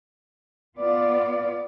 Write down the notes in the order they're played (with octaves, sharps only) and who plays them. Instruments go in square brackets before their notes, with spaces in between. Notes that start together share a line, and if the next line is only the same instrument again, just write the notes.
[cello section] B3 F4 D5